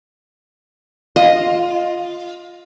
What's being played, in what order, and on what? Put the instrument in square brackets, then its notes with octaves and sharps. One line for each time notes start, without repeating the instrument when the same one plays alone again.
[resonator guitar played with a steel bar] F4 [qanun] D#5